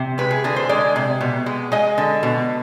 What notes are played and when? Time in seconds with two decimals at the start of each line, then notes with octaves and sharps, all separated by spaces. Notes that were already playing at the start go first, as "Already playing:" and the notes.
Already playing: C3
0.18 G#3 B4
0.31 G#4
0.44 D3 G#4
0.56 C5
0.69 G#3 D5
0.96 C3
1.21 B2
1.46 G#3
1.72 G#3 D#5
1.98 D3
2.23 B2